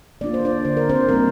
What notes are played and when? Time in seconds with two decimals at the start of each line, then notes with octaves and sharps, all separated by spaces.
0.21 A#3 D4 F4 D5
0.34 C5
0.45 D4 D5
0.65 D3 C5
0.77 A#4
0.89 C4 C5
1.09 G3 A#3 C4 D#4 A#4